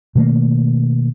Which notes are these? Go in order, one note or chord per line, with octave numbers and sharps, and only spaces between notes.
B2 D#3 A3 A#3